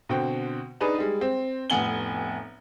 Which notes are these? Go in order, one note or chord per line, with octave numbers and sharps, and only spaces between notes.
B2 D3 C4 F#4 G5
D4 D#4 G#4 B4
G3 G#3
C4
F1 A2 B3 G#5 F#7 G7